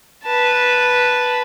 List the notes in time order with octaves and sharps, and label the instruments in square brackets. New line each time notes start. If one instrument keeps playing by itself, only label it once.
[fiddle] B4 A5